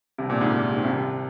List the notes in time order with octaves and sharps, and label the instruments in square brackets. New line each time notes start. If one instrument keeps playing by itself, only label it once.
[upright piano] C2 C3
A#2
G#2
A#2
C3
D#3
C2 C3